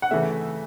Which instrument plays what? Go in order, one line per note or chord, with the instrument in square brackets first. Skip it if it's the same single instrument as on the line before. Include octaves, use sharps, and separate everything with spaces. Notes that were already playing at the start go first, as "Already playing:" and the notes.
[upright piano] F#5
C#3 E3 A3 E5